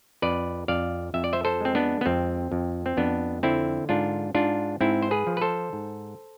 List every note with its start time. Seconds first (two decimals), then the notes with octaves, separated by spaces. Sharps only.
0.22 F2 B4 D5
0.68 F2 D5 F5
1.14 F2 E5
1.24 D5
1.33 C5 E5
1.45 A4 C5
1.60 G#3 C4
1.75 B3 D4
2.01 B3
2.06 F2 C4
2.52 F2
2.86 C4
2.97 F2 B3 D4
3.43 D3 C4 E4
3.89 G#2 D4 F4
4.34 G#2 D4 F4
4.81 G#2 C4 E4
5.02 C5
5.11 G#4 B4
5.27 F3
5.37 B4
5.41 A4 C5
5.73 G#2